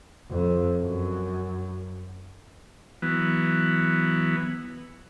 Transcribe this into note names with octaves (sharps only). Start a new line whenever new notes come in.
F2
F#2
E3 F#3 B3